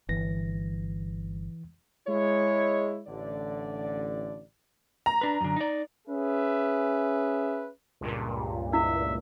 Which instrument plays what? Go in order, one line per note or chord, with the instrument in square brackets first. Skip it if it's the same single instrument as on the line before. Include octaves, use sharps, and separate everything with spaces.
[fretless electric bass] G1 [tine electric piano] E3 A#6
[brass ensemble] G#3 E4 C#5
A1 D3 D5
[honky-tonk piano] A#5
[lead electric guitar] D4 B4
F#2 D3
D#4 D5
[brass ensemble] C#4 G#4 B4 E5
[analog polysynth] C#2 G2 A#2
[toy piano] E4 [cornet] E5